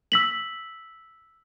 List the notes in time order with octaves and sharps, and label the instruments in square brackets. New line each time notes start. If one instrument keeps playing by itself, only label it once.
[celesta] E6 B6 F#7